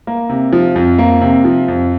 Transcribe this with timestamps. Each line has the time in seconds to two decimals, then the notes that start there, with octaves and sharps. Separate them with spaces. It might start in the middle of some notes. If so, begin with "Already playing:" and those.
0.07 A#3
0.29 C3
0.53 F3
0.76 F2
0.98 A#3
1.21 C3
1.45 F3
1.68 F2